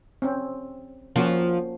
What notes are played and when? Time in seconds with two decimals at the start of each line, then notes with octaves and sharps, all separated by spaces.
0.22 C4 C#4
1.16 F3 A#3 C#4 F#4